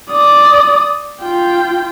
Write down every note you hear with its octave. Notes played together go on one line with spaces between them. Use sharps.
D5 D#6
F4 G5